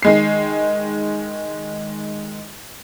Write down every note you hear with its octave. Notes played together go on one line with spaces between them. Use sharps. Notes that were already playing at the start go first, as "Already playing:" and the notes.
D#3 G#3 C7